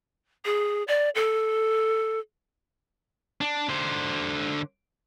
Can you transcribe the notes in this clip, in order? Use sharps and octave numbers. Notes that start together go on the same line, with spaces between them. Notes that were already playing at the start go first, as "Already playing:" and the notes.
G#4
D5
A4
D4
D3 C5